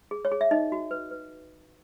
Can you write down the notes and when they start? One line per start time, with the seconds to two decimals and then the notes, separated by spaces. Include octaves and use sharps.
0.11 G#4
0.25 C#5
0.31 G#4
0.41 E5
0.51 D#4 D#5
0.72 F#4
0.91 B4
1.11 B4